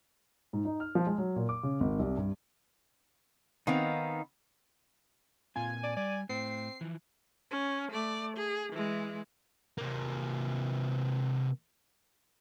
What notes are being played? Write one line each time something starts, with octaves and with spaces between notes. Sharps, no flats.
G#2
D#4
F6
F3
G#3
F#3
A#2
D6
C#3
G#1
C2
G2
D#3 B3 C4 D#4 F5
A#2 C4 F4 G#5
D5
G3 D5
A2 C4 C7
E3 F3
C#4
A3 D5
G#4
E3 G#3
C3 A#3